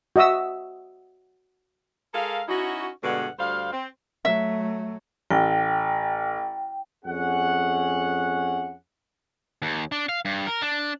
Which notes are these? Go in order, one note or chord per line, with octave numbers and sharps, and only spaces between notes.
F#4 D#5 E5 D#6 E6
G#3 A4 A#4 F5
C#4 D#4 E4 F#4
G2 B2 D3 G#3 D4 F#5
D2 G3 C5 F5
C4
F#3 A3 E5
A1 G5
F2 C#4 G#4 F#5
D#2
D4
F5
G2
A#4
D4